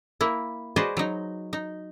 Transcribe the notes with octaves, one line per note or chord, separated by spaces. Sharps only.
A#3 E4
F#4 G#4 B4 C5 D5 D#5
F#3 D#4
D#4